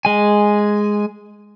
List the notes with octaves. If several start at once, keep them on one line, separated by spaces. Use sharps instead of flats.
G#3 G#5